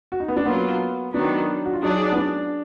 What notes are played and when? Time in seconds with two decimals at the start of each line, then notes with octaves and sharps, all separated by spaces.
0.12 F#4
0.20 D#4
0.28 B3
0.37 D4
0.46 F#3 A#3 B3 F4
1.14 D#3 F#3 B3 D4
1.65 F#4
1.73 F4
1.83 F#3 D4 D#4 G#4 D5
2.12 B3
2.16 D4